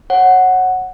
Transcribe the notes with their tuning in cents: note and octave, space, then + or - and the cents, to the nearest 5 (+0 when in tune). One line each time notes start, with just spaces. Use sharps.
C#5 -20 F#5 +0